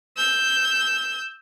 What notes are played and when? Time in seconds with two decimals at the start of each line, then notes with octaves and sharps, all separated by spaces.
0.17 E6 G6